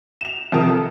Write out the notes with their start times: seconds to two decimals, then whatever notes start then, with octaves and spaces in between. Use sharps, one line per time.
0.21 E7 F7
0.52 F2 C3 F3 A#4 A5 D#6
0.69 A4